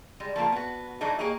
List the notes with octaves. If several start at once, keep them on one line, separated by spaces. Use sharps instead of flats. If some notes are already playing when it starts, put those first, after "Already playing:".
G3 G#3
F3 A3 A#3 F4
B3 F#4
E3 F#3 A3 D4 D#4
A#3 G4 G#4 C#5 D#5